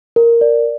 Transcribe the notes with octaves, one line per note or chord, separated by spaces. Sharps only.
A#4
D5